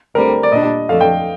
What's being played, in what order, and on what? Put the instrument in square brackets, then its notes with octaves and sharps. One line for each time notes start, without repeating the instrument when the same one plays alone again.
[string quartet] D2 D3 G3 C4 [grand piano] A#4
[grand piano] D5
[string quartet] A#2 G3 D4 [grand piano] D#5
[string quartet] F2 D3 A3 [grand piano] F5
[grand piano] G5